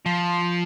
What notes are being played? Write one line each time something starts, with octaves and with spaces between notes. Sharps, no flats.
F3